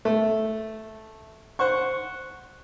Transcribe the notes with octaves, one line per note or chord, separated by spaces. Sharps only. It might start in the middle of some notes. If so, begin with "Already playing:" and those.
A3
C5 F#5 C#6